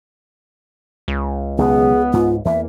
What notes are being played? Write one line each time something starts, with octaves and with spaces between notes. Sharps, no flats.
C#2
B1 C#3 G#3 B3 G#4
G#2 F4
E2 E3 A#3 E5